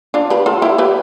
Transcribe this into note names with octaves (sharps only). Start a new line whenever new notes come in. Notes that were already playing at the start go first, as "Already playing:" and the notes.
D4 F4
G4 B4
F4 A4
E4 G4
G4 B4